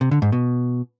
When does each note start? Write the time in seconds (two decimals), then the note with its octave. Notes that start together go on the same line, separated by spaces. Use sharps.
0.01 C3
0.11 D3
0.22 G#2
0.32 B2